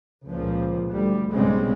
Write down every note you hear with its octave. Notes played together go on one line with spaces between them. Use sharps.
C#2 A#2 F3
D2 G3
B1 G#2 C#3 G3 G#3 C4